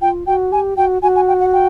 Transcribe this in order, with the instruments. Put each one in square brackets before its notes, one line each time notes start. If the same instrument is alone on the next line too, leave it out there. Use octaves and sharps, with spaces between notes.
[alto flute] F4 [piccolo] G5
[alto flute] F#4 [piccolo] G5
[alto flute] G4 [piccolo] G#5
[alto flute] F#4 [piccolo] G5
[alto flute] F#4 [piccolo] G#5
[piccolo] G#5
G5
F#5
G5